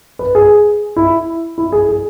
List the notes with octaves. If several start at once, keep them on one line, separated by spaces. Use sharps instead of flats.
B4
G#4
E4
E4
G#4
G#4